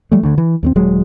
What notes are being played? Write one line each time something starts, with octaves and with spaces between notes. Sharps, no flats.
F3 G3 A3
D2 D3
E3
D#2 A3 C4
D#1 F#3 G#3